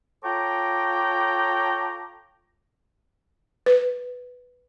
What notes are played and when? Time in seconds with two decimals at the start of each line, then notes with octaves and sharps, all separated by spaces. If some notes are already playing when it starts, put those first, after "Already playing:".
0.24 F4 A4 C#5 G5 A#5 D6
3.66 B4